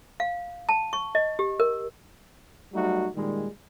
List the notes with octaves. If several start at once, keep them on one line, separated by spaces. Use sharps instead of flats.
F5
A5
C#6
D#5
G4
A#4
F#3 G3 A3 D#4 F#4
A#2 D#3 G3 G#3